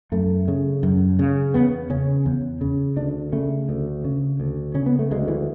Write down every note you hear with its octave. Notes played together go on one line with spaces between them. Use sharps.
F#2 A3
C#3
F#2
C#3
E2 B3
C#3 C#4
E2
C#3
D2 D4
C#3 A3
D2
C#3
D2
C#3 C#4
B3
A3
D2 G#3
E3